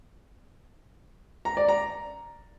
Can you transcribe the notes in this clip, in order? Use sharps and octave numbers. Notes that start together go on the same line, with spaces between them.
A#5
D5
A#5